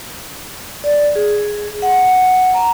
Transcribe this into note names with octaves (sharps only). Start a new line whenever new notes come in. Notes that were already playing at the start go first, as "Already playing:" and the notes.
D5
G#4
F#5
A#5